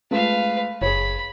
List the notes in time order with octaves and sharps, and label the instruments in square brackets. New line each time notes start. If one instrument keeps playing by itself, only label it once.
[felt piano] G#3 A3 F4 [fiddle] B4 F5
[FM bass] F#1 [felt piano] G#4 C#5 [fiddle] B5